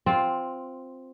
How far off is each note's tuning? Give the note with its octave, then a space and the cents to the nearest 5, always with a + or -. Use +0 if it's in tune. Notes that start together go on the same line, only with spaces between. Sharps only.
C4 +0 F4 +10